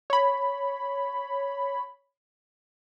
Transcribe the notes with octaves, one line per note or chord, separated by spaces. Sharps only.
C#5 B5